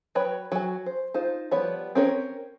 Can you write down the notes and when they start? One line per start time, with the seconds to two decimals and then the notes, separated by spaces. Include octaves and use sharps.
0.15 F#3 B4 C#5 G5 B5
0.52 F#3 G#5
0.86 C5
1.14 D#4 F4 C5
1.51 F3 G3 B3 C#5 B5
1.95 C4 C#4 A#4 C#5